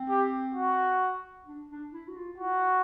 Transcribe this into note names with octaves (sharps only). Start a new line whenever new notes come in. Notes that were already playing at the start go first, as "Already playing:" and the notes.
Already playing: C4
G4
F#4
D4
D4
E4
F#4
F4
E4 F#4